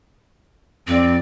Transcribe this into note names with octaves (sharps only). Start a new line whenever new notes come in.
F2 C4 D5